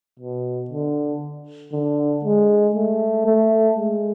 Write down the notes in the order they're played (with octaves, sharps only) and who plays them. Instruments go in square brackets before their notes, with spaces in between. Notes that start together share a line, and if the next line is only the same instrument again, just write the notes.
[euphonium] B2
D3
D3
G#3
A3
A3
G#3